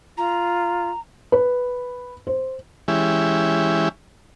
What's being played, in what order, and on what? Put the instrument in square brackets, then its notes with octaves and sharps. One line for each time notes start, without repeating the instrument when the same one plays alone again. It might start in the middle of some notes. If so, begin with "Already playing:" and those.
[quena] F4 [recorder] A#5
[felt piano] B4
C5
[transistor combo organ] E3 G#3 C#4 E4 G4